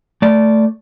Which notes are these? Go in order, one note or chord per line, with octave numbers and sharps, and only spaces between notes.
A3 D5